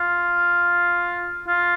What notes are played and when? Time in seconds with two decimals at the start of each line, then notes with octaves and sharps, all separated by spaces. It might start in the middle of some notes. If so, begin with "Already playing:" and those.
Already playing: F4
1.48 F4